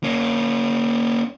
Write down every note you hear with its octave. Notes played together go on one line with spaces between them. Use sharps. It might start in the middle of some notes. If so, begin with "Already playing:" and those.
A#3 C#4